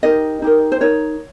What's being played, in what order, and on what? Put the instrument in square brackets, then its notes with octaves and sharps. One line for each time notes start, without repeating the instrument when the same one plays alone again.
[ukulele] D#4 G4 A#4 D#5
D#4 G4 A#4
C5
D#4 A#4 C#5